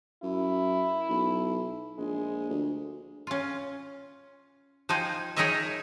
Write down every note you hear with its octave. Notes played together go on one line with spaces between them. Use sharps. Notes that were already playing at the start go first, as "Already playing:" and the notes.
F#2 E4
B1
A#1 G#3
D2
C#4 F4
F3 D#4 F4 C5 G5 G#5
D#4 G#4 A#4 C#5 D#5 E5